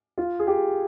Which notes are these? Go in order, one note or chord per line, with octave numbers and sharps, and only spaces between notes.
F4
G#4
G4